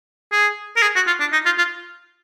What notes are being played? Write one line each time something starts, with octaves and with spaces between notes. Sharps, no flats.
G#4
A#4
G#4
F#4
F4
D4
D#4
F4
F4